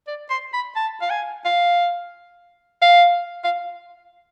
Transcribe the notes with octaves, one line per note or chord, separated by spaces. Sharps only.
D5
C6
B5
A5
F5
G#5
F5
F5
F5